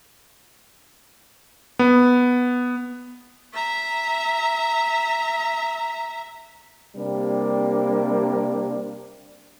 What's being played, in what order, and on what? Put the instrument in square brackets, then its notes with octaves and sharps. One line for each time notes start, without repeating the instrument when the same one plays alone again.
[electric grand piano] B3
[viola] E5 A#5
[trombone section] C3 G3 A#3 D4